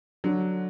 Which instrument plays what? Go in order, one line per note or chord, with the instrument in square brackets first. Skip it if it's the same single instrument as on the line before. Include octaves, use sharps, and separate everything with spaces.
[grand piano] D3 [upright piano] F#3